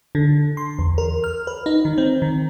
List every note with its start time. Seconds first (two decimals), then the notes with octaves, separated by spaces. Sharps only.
0.15 D3
0.57 C6
0.79 E2
0.98 A#4
1.24 F6
1.47 B4
1.66 D#4
1.85 D#3
1.98 C4
2.22 D#3